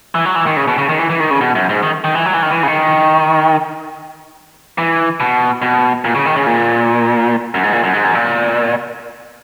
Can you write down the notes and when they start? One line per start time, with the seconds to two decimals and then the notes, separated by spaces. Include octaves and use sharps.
0.15 E3
0.25 F#3
0.36 E3
0.47 D#3
0.57 C#3
0.68 B2
0.78 C#3
0.89 D#3
0.99 E3
1.10 E3
1.20 D#3
1.31 C#3
1.41 B2
1.55 F#2
1.69 G#2
1.83 D#3
2.04 D#3
2.15 E3
2.26 F#3
2.34 E3
2.43 D#3
2.51 E3
2.63 C#3
2.68 D#3
4.78 E3
5.20 B2
5.62 B2
6.05 A#2
6.15 C#3
6.26 D#3
6.36 C#3
6.46 A#2
7.55 F#2
7.63 G#2
7.73 A#2
7.84 F#2
7.94 G#2
8.04 F#2
8.15 A#2